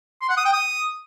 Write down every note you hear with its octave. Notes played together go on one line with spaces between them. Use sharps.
C6
F#5
D#6
G5
D#6